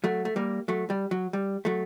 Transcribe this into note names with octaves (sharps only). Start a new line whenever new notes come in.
F#3 A3
A3
G3 A#3
F#3 A3
G3
F#3
G3
F#3 A3